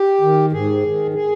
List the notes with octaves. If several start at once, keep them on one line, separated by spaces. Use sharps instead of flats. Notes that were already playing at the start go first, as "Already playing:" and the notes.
Already playing: G4
D#3
G#2 G#4
D#3
G#4